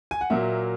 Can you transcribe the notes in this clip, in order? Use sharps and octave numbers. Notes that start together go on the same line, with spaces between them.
G#5
F#5
A#2 F#3 A#3 E5